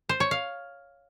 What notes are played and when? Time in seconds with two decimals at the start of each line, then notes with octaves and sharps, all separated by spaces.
0.09 C5
0.20 C#5
0.31 F5